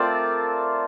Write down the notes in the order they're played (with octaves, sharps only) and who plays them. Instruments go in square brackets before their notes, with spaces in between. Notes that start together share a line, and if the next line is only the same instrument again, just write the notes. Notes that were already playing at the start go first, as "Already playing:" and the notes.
Already playing: [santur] A3 C4 F4 A#4 C5 D5